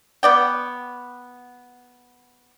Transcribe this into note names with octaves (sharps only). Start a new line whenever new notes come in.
B3 D5 G5